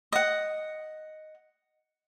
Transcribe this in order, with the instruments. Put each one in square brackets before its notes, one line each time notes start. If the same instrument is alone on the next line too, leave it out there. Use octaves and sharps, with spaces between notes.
[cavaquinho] D#5 F#5